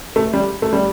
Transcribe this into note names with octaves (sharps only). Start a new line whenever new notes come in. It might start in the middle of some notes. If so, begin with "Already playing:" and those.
A3
G3
A3
G3